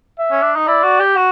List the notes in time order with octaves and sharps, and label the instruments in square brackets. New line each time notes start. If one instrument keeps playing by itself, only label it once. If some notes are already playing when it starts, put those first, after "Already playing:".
[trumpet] E5
[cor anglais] C#4
D4
D#4
[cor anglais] E4 [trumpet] D5
[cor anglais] F#4
G4
F#4